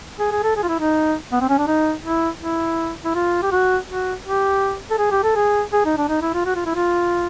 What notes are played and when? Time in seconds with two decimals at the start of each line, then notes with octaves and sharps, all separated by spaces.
0.19 G#4
0.31 G#4
0.43 A4
0.56 G#4
0.63 F4
0.68 E4
0.80 D#4
1.32 B3
1.41 C4
1.49 C#4
1.58 D4
1.67 D#4
2.03 E4
2.40 E4
3.04 E4
3.15 F4
3.43 G4
3.51 F#4
3.88 F#4
4.25 G4
4.91 A4
4.98 G#4
5.11 G4
5.23 A4
5.36 G#4
5.73 G#4
5.85 D#4
5.97 D4
6.09 D#4
6.21 E4
6.34 F4
6.46 F#4
6.55 F4
6.66 E4
6.75 F4